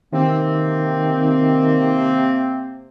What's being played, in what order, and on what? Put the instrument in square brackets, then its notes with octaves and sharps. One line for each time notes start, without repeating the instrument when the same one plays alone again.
[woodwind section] C3 A#3 C4 [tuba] D#3